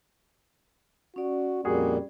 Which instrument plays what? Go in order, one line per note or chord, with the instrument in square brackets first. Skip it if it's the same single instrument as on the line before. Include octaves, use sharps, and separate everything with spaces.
[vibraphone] C#4 D5 [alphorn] F#4
[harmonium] F2 A#2 A#3 [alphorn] G3 [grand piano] F#4 G#4